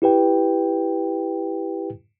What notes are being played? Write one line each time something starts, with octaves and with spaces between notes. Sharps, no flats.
E4 G4 B4 G5